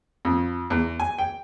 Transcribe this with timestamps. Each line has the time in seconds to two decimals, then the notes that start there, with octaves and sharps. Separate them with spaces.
0.25 F2
0.70 E2
1.00 G#5
1.18 G5